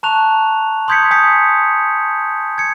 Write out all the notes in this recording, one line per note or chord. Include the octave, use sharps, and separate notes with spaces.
A5 A#5 C#6 F#6 F7
C6 D#6 G6 G#6 B6 C#7
G#5 D#6 G6 B6 C#7
G#6 C#7